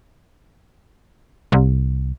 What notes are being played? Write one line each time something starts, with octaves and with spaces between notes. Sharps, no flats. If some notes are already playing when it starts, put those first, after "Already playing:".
C2